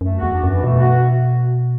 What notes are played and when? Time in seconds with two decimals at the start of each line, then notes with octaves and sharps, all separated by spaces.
0.01 F#2 A3
0.17 F#4
0.23 E2
0.33 D4
0.43 F#2 E3
0.63 B2 A3
0.79 F#4